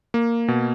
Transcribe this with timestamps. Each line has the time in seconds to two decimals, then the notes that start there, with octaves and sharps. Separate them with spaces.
0.14 A#3
0.48 B2